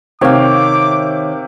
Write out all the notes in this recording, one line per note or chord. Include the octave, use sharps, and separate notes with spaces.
C3 D#3 C#5 F5 G5 D6